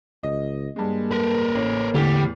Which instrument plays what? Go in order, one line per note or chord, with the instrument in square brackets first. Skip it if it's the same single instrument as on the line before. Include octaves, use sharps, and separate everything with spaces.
[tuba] C#2 [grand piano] D#5
[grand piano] G2 G#3 [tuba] A#3
[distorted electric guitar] A#4 B4
[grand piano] A1 C#4
[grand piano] E2 A2 [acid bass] D3 [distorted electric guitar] G3